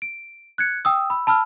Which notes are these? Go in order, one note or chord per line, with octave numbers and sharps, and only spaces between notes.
D7
F#6 G#6 C#7
G5 D#6 E6
B5 E6
A5 B5 E6 F6